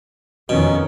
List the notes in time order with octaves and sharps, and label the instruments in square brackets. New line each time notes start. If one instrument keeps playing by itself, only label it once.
[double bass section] F2 D#3 C#4 [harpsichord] B2